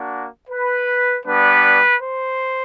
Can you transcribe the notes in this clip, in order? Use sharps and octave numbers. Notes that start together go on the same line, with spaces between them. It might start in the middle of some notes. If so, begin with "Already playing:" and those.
Already playing: A#3 D4 F#4
B4
G3 B3 D4 B4
C5